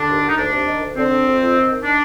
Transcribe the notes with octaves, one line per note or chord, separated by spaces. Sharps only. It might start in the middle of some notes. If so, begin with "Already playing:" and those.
Already playing: D3 D4
D#2
D#2
D#4
D2 D4
C3
D#3
D2
D3 C4
D3
F2
F2
D#3
D#3
D4